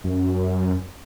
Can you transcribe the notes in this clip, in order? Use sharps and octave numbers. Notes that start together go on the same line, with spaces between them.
F#2